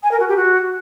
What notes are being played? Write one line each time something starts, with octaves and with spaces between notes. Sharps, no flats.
G#5
A#4
F#4
G4
F#4